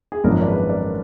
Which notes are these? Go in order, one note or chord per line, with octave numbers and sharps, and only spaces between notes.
G#4
G#1 F#2 F3 A#3 D4 A#4
D5
G#4 B4
A#4 D5